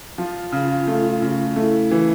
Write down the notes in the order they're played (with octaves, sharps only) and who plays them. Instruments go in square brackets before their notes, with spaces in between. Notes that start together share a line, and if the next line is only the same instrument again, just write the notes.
[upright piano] F3 [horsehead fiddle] F4
[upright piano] C#3
A3
C#3
[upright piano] A3 [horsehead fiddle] E4
[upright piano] E3